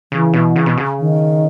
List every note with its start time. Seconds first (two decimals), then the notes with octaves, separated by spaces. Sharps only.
0.12 C#3 E3
0.34 B2
0.56 C#3
0.66 B2
0.77 C#3
0.99 D#3